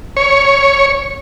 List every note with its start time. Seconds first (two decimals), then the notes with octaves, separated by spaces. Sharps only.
0.17 C#5